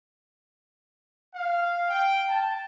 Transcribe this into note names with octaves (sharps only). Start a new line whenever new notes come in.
F5
G5
A5